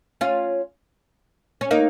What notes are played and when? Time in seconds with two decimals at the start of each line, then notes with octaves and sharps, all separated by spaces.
0.21 C#4 F4
1.61 C#4
1.71 A#3 D#4